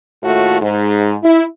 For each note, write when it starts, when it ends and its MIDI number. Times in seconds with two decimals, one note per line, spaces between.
0.23 0.60 39
0.23 0.60 45
0.23 0.60 57
0.23 0.60 65
0.23 0.60 66
0.61 1.15 44
1.22 1.42 64